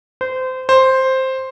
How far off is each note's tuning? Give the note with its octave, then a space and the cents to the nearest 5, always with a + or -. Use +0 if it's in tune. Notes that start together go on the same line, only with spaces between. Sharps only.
C5 -25
C5 +5